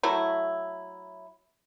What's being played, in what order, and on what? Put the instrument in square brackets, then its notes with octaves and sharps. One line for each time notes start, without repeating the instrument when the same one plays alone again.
[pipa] F#3 A3 E4